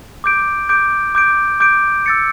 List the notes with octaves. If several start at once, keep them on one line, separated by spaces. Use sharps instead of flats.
D6 G6 D7
D6 G6 D7
D6 G6 D7
D6 G6 D7
E6 A6 C#7